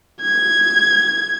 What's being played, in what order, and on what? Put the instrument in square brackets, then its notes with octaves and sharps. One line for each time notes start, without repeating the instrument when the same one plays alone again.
[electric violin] G#6